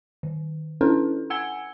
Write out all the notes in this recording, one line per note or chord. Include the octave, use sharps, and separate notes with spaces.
D#3
C#4 D4 E4 A4 B4
F#5 G#5 E6 G#6 C#7 G7